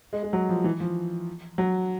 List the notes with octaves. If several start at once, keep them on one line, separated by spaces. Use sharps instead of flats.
G#3
G#3
F#3
F3
E3
F3
F#3